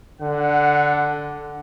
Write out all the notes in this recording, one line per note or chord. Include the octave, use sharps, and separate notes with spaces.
D3 F#5